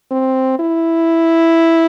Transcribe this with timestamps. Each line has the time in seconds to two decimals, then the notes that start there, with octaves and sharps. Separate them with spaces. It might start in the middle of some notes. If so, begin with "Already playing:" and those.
0.11 C4
0.59 E4